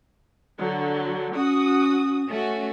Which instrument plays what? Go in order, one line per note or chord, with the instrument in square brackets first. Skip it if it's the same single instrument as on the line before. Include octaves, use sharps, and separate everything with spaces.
[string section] D3 F#3
[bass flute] C#4 [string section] F#4 D#6
[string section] A3 C#4 F#4